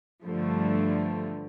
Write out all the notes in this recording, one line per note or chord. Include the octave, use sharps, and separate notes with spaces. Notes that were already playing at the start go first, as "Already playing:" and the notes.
G2 D3 F3 A3